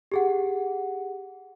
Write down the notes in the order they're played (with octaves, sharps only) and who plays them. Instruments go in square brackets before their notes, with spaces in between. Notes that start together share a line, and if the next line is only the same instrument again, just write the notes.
[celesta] G4 G#4 F#5